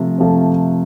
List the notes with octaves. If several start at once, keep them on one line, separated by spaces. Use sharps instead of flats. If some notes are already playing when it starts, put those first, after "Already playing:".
Already playing: C3 F3 A3
C3 F3 A3